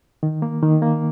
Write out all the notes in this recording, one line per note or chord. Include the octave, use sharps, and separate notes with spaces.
D#3
A#3
D#3
A#3